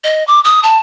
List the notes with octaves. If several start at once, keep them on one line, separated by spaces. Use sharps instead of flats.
D#5
D6
D#6
A5